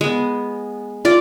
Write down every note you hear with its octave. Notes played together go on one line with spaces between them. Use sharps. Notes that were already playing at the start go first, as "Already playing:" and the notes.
G#3 B3
F4 D5